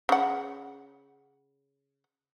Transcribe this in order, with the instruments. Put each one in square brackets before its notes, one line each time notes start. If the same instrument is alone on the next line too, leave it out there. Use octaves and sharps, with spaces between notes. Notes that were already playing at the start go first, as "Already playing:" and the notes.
[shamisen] C#3 F#5